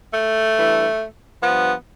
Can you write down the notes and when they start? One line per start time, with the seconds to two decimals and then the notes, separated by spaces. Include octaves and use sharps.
0.13 A3
0.56 G2 E3
1.43 G2 F3 B3